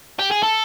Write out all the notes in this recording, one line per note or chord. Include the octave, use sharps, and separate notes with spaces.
G4
G#4
A4